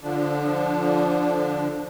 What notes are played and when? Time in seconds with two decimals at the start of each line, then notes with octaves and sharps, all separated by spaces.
0.01 D3 F3 D4